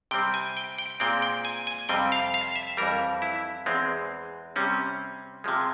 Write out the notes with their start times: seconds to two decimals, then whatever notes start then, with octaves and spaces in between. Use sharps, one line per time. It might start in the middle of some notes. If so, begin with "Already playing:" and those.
0.11 C3 G3 C4 G5
0.34 G#5
0.57 G5
0.78 G5
1.00 A#2 G#3 C4 G5
1.22 G5
1.45 G#5
1.67 G#5
1.89 F2 C3 G3 C4 G5
2.12 F5
2.34 F5
2.56 E5
2.77 F2 E3 G3 A#4
3.22 E4
3.66 E2 E3 G#3 C4
4.56 C3 G3 C4 C#4
5.44 C3 F3 G#3